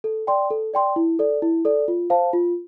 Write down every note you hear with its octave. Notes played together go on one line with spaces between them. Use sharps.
A4
D5 G5 C6
A4
D5 G5 C6
E4
A4 D5
E4
A4 D5
F4
C5 F5 A5
F4